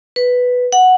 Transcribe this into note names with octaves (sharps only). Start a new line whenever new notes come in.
B4
F#5